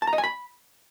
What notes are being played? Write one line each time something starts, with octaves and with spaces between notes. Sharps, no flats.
A5
A#5
D#5
G#5
B5